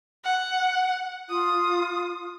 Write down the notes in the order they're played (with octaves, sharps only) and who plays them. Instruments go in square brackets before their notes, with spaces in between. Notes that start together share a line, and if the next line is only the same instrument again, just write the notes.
[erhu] F#5
[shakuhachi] F4 [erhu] D#6